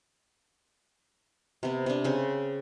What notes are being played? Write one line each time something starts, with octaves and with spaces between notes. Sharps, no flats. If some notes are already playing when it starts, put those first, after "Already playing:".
C3 B3
C3 D4
C#3 C4